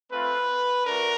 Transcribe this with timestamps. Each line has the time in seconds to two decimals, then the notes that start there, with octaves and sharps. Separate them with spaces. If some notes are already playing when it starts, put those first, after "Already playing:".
0.10 A3 C4 F4 B4
0.86 A3 D4 F#4 A#4